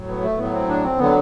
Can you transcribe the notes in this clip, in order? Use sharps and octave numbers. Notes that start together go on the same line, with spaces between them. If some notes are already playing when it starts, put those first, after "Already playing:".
Already playing: A2 F#3
B3
A3
A2 F#3 B3
C4
D4
C4
D3 F#3 B3